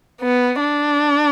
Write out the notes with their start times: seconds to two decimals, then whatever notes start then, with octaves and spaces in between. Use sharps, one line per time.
0.22 B3
0.61 D4